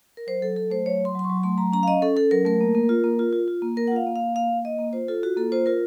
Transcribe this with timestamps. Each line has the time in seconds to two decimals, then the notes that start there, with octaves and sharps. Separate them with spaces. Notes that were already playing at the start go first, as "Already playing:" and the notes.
0.17 A#4
0.27 F#3 C5
0.42 F#3 A4
0.56 F#3 A4
0.70 A3 C5
0.86 F#3 C#5
1.01 F#3 C6
1.15 F#3 C6
1.24 C#6
1.30 F#3
1.43 A3 C6
1.58 F#3 A#5
1.73 C#4 A#5
1.83 F5
1.87 C#4 D#5
2.02 C#4 A4
2.16 C#4 A4
2.31 F#3 A#4
2.45 A3 A#4
2.61 A#3
2.75 A#3
2.89 F4
3.04 A#3
3.19 F4
3.33 F4
3.48 F4
3.62 A#3
3.77 A#3 A#4
3.87 F#5
3.92 F4 F5
4.07 A#3
4.16 F5
4.21 A#3
4.35 A#3 F5
4.49 A#3
4.64 A#3 D#5
4.79 A#3
4.93 F4 C5
5.08 F4 A4
5.23 F4 F#4
5.37 A#3 A4
5.52 F4 C5
5.66 F4 A#4